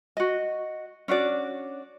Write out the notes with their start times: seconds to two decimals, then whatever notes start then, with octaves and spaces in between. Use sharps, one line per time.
0.17 F#4 D#5
1.08 C#4 D4 F#4 D5